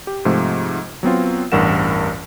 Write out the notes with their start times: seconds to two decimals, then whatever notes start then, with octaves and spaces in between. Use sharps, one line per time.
0.07 G4
0.25 G#2 C3 F3 A3
1.03 F#3 B3 C4 F4
1.52 A1 E2 G2 A#4 F#5 E7